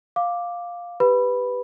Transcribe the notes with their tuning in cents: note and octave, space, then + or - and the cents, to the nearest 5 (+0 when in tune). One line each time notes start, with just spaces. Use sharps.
F5 +10 D6 +0
G4 +0 B4 +5 B5 +0